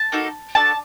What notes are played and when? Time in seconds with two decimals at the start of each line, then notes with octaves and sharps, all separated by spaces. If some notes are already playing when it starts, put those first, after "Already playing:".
Already playing: A5
0.12 A#3 D#4 F#4 A4
0.55 D4 F#4 A4 A5